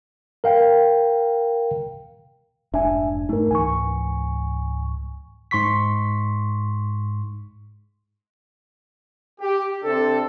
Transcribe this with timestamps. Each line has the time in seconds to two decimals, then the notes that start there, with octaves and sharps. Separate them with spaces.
0.44 A#4 F5 G5
2.74 F1 G#2 D4 E5 G#5
3.29 G#2 A3 D#4 A#4
3.51 C#2 G#2 E3 G#5 C#6
5.51 G#2 C6 C#6 B6
9.41 G4
9.84 C3 C4 D4 A4